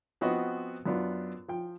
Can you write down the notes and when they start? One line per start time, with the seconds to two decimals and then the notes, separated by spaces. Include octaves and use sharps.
0.21 F3 B3 C4 F#4 B4 D#5
0.86 F#2 B3 D4 F4
1.48 F3 G5